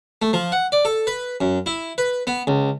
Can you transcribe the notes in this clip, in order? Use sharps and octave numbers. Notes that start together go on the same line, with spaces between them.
A3
F3
F#5
D5
A4
B4
F#2
E4
B4
B3
C#2